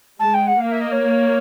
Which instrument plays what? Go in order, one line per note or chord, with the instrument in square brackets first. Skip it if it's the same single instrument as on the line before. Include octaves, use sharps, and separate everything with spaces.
[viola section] G#3 [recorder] A5
[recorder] G5
F#5
[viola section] A#3 [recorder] F5
[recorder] E5
D#5
C#5